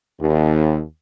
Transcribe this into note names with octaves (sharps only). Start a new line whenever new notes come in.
D#2